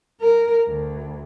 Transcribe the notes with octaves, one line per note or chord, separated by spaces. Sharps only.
A#4
D2